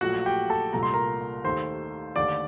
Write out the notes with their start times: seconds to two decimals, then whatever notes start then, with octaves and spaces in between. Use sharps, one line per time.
0.01 A#1 A#2 F#3 A3 F#4 F#5
0.26 G4 G5
0.50 A4 A5
0.73 C2 A#2 A3 A#5
0.83 C6
0.94 A#4 A#5
1.44 D#2 D#3 A3 C5 C6
2.16 D#2 D3 A3 D5 D6